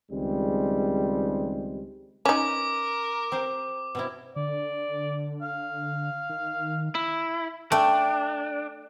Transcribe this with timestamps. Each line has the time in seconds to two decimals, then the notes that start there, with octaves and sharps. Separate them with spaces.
0.12 C#2 D#3 G3 G#3 C4
2.26 C#4 D#4 A#4 B4 C#5 D6
3.32 C4 G4 C5
3.95 B2 C4 E4
4.36 D3 D5
5.42 F5
6.29 D#3
6.95 E4
7.72 A3 D4 G5